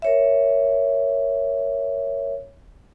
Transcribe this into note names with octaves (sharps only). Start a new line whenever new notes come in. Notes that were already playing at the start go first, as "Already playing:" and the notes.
A#4 C#5 E5